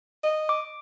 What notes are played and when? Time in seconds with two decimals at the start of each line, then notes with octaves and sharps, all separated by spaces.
0.23 D#5
0.49 D6